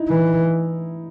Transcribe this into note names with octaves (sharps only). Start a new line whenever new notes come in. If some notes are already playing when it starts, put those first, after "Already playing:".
Already playing: D#4 E4
E3